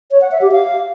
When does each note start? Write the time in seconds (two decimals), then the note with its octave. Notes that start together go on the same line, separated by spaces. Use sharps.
0.11 C#5
0.21 F#5
0.31 E5
0.42 G4
0.52 F5